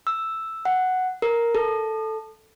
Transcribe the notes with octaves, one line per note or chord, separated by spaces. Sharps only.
E6
F#5
A#4
A4